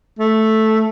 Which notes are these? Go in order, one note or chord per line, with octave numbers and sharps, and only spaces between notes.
A3